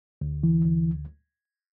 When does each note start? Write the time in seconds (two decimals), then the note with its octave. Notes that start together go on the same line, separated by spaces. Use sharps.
0.21 D2
0.43 E3
0.65 D2